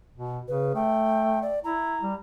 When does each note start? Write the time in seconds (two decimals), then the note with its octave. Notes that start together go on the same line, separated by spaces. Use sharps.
0.14 B2
0.48 C#3 B4
0.75 A3 G5
1.42 D5
1.64 E4 A#5
2.02 G3